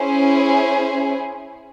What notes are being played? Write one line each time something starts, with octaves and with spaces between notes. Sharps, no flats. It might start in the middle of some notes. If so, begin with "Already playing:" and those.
Already playing: C#4 E4 G#4 C5